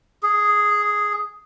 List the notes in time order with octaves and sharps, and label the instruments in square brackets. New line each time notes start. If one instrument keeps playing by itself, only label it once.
[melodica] G#4